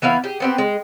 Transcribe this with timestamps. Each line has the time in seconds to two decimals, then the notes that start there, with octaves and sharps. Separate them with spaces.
0.02 E3 B3 E4 F5
0.24 G4 G#4
0.40 B3 C4 G4
0.58 G#3